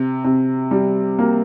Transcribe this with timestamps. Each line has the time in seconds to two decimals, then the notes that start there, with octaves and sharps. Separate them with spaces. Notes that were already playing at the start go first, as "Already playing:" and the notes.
Already playing: C3
0.24 C3
0.71 G3
1.19 A#3